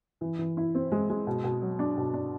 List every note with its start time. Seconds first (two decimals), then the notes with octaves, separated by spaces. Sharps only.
0.21 E3
0.39 E3
0.57 E4
0.75 C4
0.92 G#3
1.10 G#3
1.27 B2
1.44 B2
1.62 F#3
1.79 D4
1.97 B2
2.14 D4